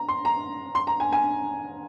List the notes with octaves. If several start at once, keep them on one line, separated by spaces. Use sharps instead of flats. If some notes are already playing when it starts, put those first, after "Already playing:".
Already playing: A#5
C6
A#5
C6
A#5
G#5
G#5